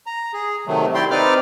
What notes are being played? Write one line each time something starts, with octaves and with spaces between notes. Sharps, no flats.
A#5
G#4
C3 D#3 F#3 A3
E4 G4 D5 G5 C6
C4 D#4 B4 D5 D6 F6